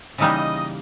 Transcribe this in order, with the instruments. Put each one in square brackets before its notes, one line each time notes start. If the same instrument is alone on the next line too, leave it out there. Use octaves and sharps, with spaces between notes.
[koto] C#3 E3 G3 A#3 D#4 [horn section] D#5